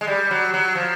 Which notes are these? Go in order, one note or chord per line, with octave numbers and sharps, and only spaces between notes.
G#3
G3
F#3
F#3
F3